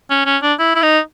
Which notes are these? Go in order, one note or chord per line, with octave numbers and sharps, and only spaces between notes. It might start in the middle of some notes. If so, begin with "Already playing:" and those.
C#4
C#4
D4
E4
E4
D#4